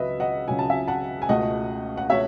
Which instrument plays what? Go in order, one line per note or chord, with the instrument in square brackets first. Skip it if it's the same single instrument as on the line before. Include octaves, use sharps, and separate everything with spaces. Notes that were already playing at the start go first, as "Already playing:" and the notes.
Already playing: [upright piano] C#2 C#3 F#3 B4 D#5 E5
D#5 F#5
C#2 C#3 F#3 G#5
A5
E5 G#5
F#5 A5
G#5
C#2 B2 A3 D#5 F#5
F#5
B2 A3 C#5 E5